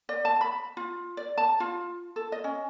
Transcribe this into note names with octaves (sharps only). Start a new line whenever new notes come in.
D5
A5
B5
F4
D5
A5
F4
A4
D#5
C#4